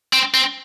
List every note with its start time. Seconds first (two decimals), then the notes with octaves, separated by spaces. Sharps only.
0.13 C4
0.34 C4